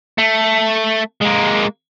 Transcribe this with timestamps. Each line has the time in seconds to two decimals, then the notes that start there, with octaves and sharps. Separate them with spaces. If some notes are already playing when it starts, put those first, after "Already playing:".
0.18 A3
1.22 G#3 A#3